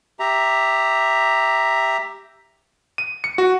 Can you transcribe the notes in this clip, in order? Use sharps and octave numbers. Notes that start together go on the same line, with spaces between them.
G4 E5 A#5
D#7
C#7
F#4